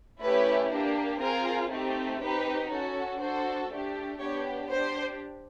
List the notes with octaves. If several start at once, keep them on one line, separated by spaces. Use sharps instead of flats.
A3 C#4 E4 G4 B4
A#3 D4 G4
C4 F4 G#4 A#4
A3 C4 D#4 G4
C4 D#4 G4 B4
C#4 F#4 A4
D4 F#4 A4 C5
A3 D4 G4
B3 D4 G4 C#5
D4 G4 C5